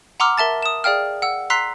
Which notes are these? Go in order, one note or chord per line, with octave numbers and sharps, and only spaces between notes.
F#5 A#5 C6 D6 E6 F6
A#4 E5 A5 A6
D#6 E7
G#4 D5 F5 G5 F6
F#5 E6
A#5 C6 E6 F#6 B6 C7